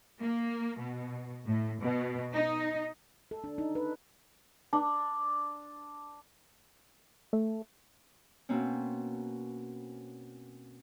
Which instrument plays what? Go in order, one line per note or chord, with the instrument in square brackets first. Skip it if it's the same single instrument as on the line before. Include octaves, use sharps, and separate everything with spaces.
[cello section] A#3
B2
A2
B2
D#4
[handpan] A4
D4
D#4
B4
[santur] D4
[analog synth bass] A3
[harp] B2 A#3 C4 C#4